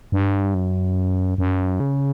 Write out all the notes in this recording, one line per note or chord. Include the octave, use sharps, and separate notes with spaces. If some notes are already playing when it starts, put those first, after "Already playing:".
G2
F#2
F#2
C#3